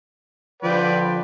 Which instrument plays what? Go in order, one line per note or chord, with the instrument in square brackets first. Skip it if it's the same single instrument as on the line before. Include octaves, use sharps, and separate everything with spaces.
[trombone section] D3 F3 [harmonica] B4 D5 G5